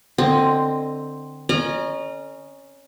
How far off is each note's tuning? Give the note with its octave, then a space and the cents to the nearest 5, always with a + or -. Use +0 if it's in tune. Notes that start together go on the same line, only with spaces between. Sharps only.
D3 +15 C4 +0 D#5 +0
C#4 +0 D#5 -35 A#5 +20